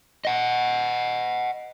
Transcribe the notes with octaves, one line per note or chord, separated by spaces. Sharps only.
D#5 F#5